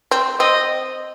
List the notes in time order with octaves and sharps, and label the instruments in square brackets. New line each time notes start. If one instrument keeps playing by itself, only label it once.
[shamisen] C4
[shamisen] C4 [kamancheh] D#5